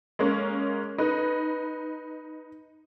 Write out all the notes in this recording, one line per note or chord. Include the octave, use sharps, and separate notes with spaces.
G#3 A#3 C#4
D#4 B4